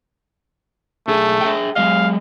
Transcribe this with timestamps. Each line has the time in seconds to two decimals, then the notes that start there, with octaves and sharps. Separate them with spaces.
1.08 B1 A3 G#4
1.41 G#4 E5 G5
1.76 F#3 G#3 D#5 F5